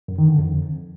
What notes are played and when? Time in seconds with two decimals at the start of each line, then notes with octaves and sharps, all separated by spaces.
0.08 F#2
0.18 D#3
0.28 D3
0.38 F2